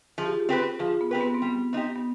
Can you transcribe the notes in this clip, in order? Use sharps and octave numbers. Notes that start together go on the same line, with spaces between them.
F3 G#4
G4
F4 G#4
C4 G4 B4
F3 F4 G#4
B3
C4 G4 B4
B3
C4
G3
B3
C4 D#4 G4
B3